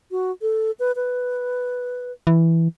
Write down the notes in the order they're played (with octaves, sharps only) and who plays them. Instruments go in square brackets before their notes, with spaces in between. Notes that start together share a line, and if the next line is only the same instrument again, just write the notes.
[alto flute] F#4
A4
B4
B4
[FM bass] E3